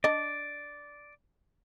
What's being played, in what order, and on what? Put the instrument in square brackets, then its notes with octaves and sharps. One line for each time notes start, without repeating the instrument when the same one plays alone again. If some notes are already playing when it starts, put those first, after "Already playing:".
[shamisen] D4 D#5 [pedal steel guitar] D5